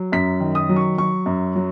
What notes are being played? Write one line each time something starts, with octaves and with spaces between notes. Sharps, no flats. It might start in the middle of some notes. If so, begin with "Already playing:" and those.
Already playing: F#3
F#2 B6
D#3
D#6
F#3
C#6
F#3 C#6
F#2
F#3